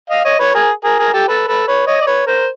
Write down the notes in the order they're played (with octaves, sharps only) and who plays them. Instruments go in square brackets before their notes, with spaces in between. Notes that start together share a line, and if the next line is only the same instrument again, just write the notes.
[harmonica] D#5 F5
C#5 D#5
B4 C#5
G#4 A#4
G#4 A#4
G#4 A#4
G4 A4
A4 B4
A4 B4
B4 C#5
C#5 D#5
D5
B4 C#5
A#4 C5